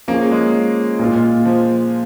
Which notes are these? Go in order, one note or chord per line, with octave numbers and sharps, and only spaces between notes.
F3 A#3 C#4 G#4
G#3
A#2 A#3 F4
F3